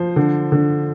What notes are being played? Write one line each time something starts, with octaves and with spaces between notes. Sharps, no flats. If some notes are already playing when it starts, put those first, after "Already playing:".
Already playing: F3 C5
D3
D3